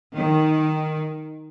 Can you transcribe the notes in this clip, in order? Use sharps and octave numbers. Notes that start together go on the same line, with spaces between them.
D#3